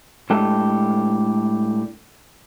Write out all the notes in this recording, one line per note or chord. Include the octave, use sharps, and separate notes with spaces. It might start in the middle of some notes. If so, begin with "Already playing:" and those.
A2 G#3 D4 G4 A4 A5